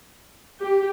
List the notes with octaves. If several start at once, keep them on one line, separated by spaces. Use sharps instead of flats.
G4